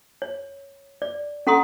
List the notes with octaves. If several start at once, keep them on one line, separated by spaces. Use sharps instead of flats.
C#5
D5
C#4 A4 F#5 A#5 C6 D#6